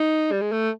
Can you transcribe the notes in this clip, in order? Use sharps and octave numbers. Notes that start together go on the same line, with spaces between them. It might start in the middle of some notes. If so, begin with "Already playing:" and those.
Already playing: D#4
G3
G#3
A3